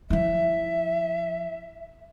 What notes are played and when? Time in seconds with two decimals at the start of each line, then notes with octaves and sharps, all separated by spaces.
0.10 F3 E4 E5